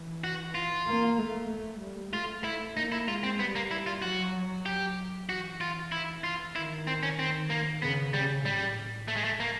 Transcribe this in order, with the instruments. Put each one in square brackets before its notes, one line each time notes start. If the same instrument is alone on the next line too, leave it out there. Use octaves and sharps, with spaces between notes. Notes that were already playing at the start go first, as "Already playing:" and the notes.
Already playing: [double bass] E3
[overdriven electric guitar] F#4
F4
[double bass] A#3
A3
A3
G3
[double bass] A3 [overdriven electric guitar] F4
[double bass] A3 [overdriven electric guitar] E4
[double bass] A#3 [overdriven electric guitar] D#4
[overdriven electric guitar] E4
[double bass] G#3 [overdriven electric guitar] F4
[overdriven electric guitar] C4
[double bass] G3 [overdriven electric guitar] B3
[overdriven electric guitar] A#3
E4
F4
[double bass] F#3 [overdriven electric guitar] F#4
[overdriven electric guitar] G4
[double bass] E3 [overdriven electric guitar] F#4
[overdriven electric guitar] F4
E4
F4
[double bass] D#3 [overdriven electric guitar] E4
[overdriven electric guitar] C4
C#4
C4
A#3
[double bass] C#3 [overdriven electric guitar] B3
[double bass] C#3 [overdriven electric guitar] G3
[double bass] A2 [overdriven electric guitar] G3
[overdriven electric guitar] A3
G#3
A3
A#3